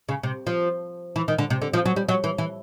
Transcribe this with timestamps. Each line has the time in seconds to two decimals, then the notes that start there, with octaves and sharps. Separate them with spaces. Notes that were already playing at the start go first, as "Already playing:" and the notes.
0.09 C#3
0.23 C3
0.47 F3
1.16 E3
1.28 D#3
1.39 D3
1.50 C3
1.62 D3
1.73 F3
1.86 F#3
1.96 G3
2.09 F#3
2.24 E3
2.38 E3